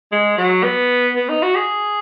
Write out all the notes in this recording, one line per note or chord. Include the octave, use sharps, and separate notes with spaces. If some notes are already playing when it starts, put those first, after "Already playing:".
G#3
F#3
B3
B3
D#4
F#4
G#4